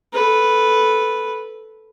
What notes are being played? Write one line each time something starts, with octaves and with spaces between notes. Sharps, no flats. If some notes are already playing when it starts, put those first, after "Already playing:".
A4 B4